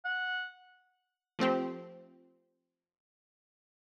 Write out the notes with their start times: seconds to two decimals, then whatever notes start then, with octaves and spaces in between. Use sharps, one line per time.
0.05 F#5
1.39 F3 A3 C4 G4